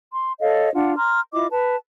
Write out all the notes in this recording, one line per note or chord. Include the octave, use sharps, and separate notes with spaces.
C6
A4 C#5 D#5 F5
D4 F4 F#5
A#5 C6 F6
E4 F4 D#5 D6
B4 A5